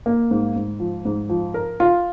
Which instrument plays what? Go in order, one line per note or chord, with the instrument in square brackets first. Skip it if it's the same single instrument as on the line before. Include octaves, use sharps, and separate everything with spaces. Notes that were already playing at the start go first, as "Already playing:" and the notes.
[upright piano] A#3
G#2
G#2
F3
G#2
F3
A#4
F4